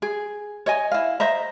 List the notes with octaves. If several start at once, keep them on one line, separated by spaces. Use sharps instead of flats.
G#4
C#5 D#5 G#5
E4 F5
C5 D#5 E5 A#5